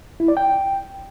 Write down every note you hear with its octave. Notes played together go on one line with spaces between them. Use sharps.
E4
D5
G5